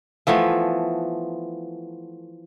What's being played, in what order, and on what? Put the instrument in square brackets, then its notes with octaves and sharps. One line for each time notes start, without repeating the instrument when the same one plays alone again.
[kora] E3 F3 A3 B3